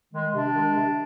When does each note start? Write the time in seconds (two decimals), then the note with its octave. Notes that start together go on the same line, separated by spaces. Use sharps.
0.14 D#3 G#3
0.34 C3 D4
0.55 D#3 G#3
0.75 C3